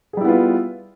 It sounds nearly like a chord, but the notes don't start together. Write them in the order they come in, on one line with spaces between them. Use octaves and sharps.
G#4 G3 E4 B3 F4